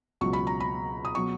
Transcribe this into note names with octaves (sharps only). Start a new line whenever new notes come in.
C#2 B2 F#3 C#6
B5
A#5
B5
D#6
B2 F#3 C#6